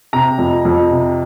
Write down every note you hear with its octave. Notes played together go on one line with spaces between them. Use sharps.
C3 A#5
F2
F2
C3